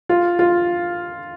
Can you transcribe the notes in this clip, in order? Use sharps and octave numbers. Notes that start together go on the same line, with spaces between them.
F4
F4